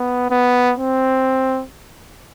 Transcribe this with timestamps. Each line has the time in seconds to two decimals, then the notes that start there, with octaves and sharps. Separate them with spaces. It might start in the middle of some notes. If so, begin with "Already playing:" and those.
Already playing: B3
0.31 B3
0.78 C4